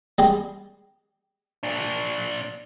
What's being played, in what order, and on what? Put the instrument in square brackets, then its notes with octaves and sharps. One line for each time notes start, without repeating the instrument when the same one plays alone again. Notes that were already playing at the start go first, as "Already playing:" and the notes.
[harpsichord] G3 G#3 G4
[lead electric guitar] A#2 D4